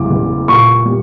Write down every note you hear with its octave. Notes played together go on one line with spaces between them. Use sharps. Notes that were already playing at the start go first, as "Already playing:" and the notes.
Already playing: F#1 E2 D6
F#1
A#2 C#6
G3